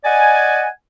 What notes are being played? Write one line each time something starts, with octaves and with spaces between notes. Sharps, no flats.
D5 D#5 F#5 G#5